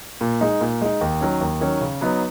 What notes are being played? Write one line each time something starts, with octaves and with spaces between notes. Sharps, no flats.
A#2
G#3 D#4
A#2
G#3 D#4
D#2
D#3 F#3 C#4
D#2
D#3 F#3 C#4
C#3
F#3 B3 D#4